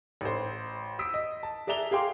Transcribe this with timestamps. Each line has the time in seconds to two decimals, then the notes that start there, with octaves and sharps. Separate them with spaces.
0.21 A1 C5
0.99 D#6 E6 B6 D7
1.14 D#5
1.43 A5
1.67 G#4 D5 E5 A#5 F7 G7
1.91 G#4 F5 G5 C6 D6